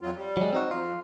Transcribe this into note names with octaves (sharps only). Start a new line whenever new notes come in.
F2 F#3 F4
G3
F#3 G#3
C4 D#4 F#4
F2 F4